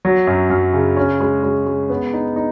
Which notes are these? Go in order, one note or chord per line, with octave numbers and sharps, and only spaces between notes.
F#3
F#2
F#2
C#3
C#4
G#3
G#3
G#3
B3
D#4
D#4